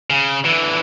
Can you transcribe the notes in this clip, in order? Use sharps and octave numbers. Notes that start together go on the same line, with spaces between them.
C#3
D3 E3